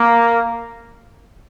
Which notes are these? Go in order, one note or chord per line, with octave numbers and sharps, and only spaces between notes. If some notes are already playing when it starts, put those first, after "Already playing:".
Already playing: A#3